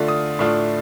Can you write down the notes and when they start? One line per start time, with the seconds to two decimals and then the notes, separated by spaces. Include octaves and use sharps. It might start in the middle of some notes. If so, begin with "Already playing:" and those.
Already playing: D3 A3 D4 F4
0.08 D#6
0.39 A2 A3 D4 F4